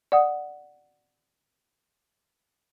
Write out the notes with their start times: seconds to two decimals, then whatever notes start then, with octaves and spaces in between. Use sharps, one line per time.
0.12 D5 F#5 D#6